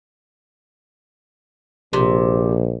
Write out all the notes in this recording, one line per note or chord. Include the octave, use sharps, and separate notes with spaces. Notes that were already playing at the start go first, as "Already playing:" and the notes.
A#1 C3